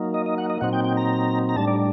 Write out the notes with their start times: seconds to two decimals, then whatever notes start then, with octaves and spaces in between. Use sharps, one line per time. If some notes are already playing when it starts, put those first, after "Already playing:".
Already playing: F#3 A#3 D#4
0.14 D#5
0.26 D#5
0.38 F#5
0.50 D#5
0.61 A#2 F#3 C4 D#4 F#5
0.73 G5
0.84 G5
0.97 A#5
1.49 A#5
1.56 A2 G3 D4 A5
1.68 D5